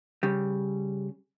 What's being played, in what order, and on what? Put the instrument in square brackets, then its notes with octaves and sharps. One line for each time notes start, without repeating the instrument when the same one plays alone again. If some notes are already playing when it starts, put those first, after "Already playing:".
[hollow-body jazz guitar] C#3 G3